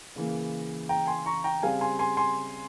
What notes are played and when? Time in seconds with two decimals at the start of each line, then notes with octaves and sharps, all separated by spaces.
0.16 C#3 E3 A#3
0.89 G5 A#5
1.07 G#5 C6
1.26 A#5 C#6
1.44 G5 A#5
1.63 C#3 G3 C4 F5 G#5
1.81 G#5 C6
1.99 G#5 C6
2.17 G#5 C6